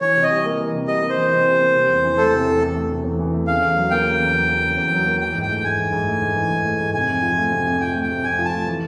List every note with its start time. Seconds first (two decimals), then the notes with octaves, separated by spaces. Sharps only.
0.01 E3 C#5
0.16 C3
0.23 D#5
0.30 G3
0.44 A#3
0.59 E3
0.73 C3
0.87 G3 D#5
1.02 A#3
1.09 C5
1.17 E3
1.31 C3
1.46 G3
1.60 A#3
1.74 C3
1.89 E2
2.03 E3
2.17 A3 A4
2.32 C3
2.46 E2
2.61 E3
2.75 A3
2.90 C3
3.04 E2
3.19 E3
3.33 A3
3.47 C#3 F5
3.62 E2
3.76 F#3
3.91 A#3 G5
4.05 C#3
4.20 E2
4.34 F#3
4.49 A#3
4.63 C#3
4.77 E2
4.92 F#3
5.06 A#3
5.20 E3 G5
5.35 G#2
5.42 G5
5.50 A3
5.64 G#2 G#5
5.78 E3
5.92 G#2
6.07 A3
6.22 G#2
6.36 E3
6.50 G#2
6.64 A3
6.80 G#2
6.94 C3 G#5
7.08 F2
7.22 F3
7.37 A3
7.52 C3
7.66 F2
7.80 F3 G5
7.95 A3
8.02 G5
8.10 C3
8.24 F2 G#5
8.38 F3
8.45 A5
8.52 A3
8.67 E3